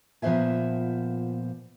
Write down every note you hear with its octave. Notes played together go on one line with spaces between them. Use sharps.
A#2 F3 B3 C5 E5 G#5